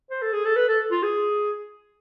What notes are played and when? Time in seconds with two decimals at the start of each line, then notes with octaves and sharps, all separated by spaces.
0.11 C5
0.22 A4
0.33 G#4
0.45 A4
0.56 B4
0.68 A4
0.91 F4
1.03 G#4